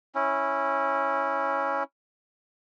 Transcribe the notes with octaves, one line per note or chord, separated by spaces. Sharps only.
C#4 E4